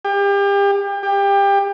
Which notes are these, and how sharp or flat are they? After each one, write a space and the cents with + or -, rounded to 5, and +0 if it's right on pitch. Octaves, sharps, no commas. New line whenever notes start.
G4 +35
G4 +25